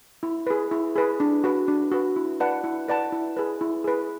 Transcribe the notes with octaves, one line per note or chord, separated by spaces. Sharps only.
E4
G#4 B4
E4
G#4 B4
D4
F#4 B4
D4
F#4 B4
E4
B4 D5 F#5 A5
E4
B4 D5 F#5 A5
E4
G#4 B4
E4
G#4 B4